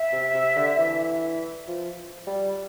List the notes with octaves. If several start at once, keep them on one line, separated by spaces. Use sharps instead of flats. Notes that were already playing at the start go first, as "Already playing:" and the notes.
Already playing: E5
C3
C3
D3
E3
F3
G3